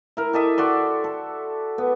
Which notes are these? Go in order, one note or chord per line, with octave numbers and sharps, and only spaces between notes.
E4 A#4
G4 A4 D#5 E5
F#4 D5 C6
A4
B3